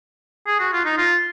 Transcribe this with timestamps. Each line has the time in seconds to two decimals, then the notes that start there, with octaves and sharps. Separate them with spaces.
0.47 G#4
0.60 F#4
0.73 F4
0.85 D#4
0.97 F4